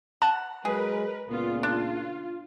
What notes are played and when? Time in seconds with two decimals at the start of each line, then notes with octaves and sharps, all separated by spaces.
0.22 F#5 A5
0.65 F#3 G#3 G#4 A#4 B4
1.29 C#2 A#2 B3 F4
1.63 D4 F4